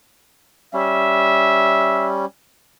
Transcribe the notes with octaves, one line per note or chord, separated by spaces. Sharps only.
G3 C#4 E5